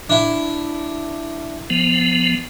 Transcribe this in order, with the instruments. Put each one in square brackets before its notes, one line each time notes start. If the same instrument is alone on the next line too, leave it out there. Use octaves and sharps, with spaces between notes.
[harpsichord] D4 E4
[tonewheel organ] F3 B3